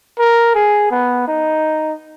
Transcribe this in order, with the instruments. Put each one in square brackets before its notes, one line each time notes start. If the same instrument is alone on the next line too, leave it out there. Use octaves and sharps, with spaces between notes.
[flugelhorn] A#4
G#4
B3
D#4